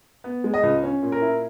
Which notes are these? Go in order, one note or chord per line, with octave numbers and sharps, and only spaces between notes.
B3
G#3
D#5
C#2
C#4
A#2
A#4
E4